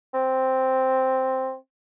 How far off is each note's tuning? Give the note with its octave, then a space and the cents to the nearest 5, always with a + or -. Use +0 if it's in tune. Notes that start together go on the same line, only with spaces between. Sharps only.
C4 +0